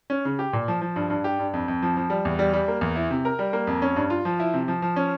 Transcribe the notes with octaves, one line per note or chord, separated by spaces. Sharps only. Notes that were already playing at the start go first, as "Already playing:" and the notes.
C#4
C#3
G4
A#2
F3
F3
G2
G2
G4
G2
F2
F2
F3
F3
G3
E2
G3
G3
A#3
E2
E4
C3
A#4
G3
A#3
F2
C#4
G2
F4
F3
E4
C3
F3
F3
C#4